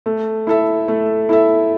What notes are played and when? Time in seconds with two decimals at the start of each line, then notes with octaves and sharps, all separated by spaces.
0.06 A3
0.47 E4 A4 E5
0.88 A3
1.29 E4 A4 E5